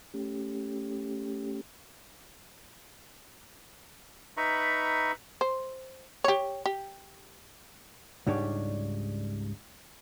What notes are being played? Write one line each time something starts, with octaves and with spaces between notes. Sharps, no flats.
A3 C#4 G4
D#4 B4 E5 A#5 B5 C#6
C5
G4 C#5
G4
C#2 G#2 G3 D4 C#5